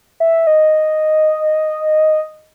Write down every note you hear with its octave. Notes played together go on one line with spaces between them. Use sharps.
E5
D#5